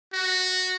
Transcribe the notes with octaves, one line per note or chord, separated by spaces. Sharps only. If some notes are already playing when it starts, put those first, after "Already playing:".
F#4